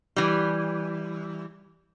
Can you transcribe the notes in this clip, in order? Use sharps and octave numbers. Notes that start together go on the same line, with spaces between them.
E3 G3